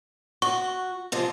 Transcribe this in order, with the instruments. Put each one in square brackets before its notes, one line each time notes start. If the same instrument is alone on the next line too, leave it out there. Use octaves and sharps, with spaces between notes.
[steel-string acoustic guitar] F#4 [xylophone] C#6
[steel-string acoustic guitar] C3 F3 G#3